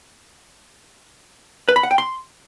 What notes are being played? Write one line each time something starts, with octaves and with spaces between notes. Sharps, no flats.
B4
B5
F#5
G5
C6